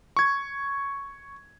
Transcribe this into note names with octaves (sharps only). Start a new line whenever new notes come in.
C#6 G#6